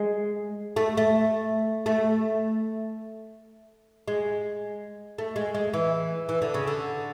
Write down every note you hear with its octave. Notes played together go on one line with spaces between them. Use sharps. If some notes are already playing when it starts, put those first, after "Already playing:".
Already playing: G#3
A3
A3
A3
G#3
A3
G#3
G#3
E3
E3
D3
C#3
D3